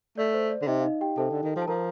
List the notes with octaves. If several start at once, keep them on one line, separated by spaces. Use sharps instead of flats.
A3 D5
C5
D5
D3
C3 D#4 D#5
F5
D#4 D#5
G4 G5
C3 A4 A5
D3
D#3
F3
A5
F3 A#4 A#5